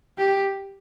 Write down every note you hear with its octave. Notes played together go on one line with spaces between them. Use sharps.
G4